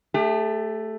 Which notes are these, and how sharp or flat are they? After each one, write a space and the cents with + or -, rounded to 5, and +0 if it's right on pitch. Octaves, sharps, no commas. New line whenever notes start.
A3 +0 G4 +45